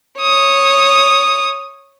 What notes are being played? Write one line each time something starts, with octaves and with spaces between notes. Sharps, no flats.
C#5 D#6